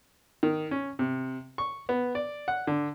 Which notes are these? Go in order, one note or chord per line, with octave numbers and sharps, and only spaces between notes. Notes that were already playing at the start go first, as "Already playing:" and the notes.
D#3
C#4
C3
C#6
B3
D5
F#5
D3